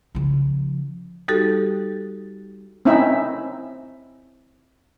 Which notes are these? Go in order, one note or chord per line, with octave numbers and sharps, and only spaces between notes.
C#3 F3
G3 D#4 F#4 G4 A4
C4 C#4 D#4 E4 E5